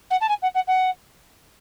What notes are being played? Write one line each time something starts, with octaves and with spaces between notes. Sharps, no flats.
F#5
A5
G#5
F#5
F#5
F#5